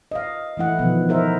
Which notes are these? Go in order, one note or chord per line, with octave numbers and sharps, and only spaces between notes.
D#5 F5
E3 A3 E4 F#5
B2 D#3 F3 B3
D#4 E4 A#4 C5 E5